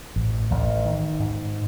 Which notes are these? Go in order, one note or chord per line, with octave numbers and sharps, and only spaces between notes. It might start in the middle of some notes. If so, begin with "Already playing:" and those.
A1
A1
D#3
G#2